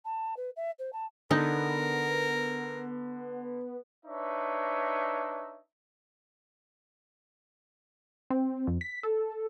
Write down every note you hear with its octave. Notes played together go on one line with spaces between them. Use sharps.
A5
B4
E5
C5
A5
D3 B3 D#4 A#4
D4 D#4 B4 C#5 E5
C4
F2
B6
A4